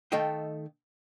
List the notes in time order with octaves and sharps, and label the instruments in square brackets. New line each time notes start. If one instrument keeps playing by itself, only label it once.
[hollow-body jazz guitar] D#3 A3 A4 D#5 F5 G5